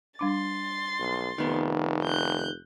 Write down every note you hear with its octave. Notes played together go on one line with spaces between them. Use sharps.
G3 D4 C6 D6 A6
B1
F1 D#3 B3
F#6 G6